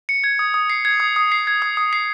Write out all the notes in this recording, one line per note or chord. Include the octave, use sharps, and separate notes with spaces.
C#7
G#6
D#6
D#6
C7
G#6
D#6
D#6
C7
G#6
D#6
D#6
C7